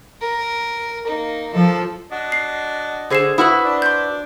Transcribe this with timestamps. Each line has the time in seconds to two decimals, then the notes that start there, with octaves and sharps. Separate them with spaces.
0.21 A#4
1.07 A#3 D#4
1.54 F3 A4
2.11 D4 F#4 D#5
2.32 C7
3.10 D3 G#4 C5 C7 E7
3.38 E4 F#4 B4 B5 D#6
3.64 D4
3.82 C6 G6